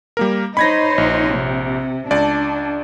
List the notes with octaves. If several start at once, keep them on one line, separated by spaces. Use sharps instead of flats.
G3 A#3 A#4
D#4 C5 C#5 B5 G#6 A#6
A#1
C3
C#2 D4 D5